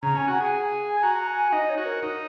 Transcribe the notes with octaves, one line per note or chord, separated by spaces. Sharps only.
C#3 A#5
C#4 G#5
F#4 F#5
G#4
G#5
F#4 A#5
A#5
G#5
D#4 D#5
C#5
F#4
A#4
D#4